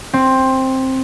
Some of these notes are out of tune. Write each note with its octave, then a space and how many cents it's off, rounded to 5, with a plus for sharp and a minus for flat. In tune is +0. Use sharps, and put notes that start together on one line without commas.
C4 +10